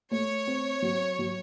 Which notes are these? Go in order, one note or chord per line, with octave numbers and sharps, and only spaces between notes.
A3 C#5
C4
F#3
F#3